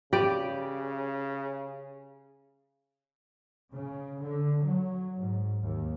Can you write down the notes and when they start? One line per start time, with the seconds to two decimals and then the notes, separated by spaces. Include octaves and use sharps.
0.13 C#3 G4 B4 D5
3.72 C#3
4.22 D3
4.64 F#3
5.16 G#2
5.63 D#2